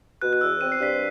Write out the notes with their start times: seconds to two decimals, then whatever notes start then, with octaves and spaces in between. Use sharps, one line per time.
0.22 B2 F#6
0.33 F#6
0.41 E2 E6
0.61 C4 D#7
0.72 C7
0.80 G2 B6 D#7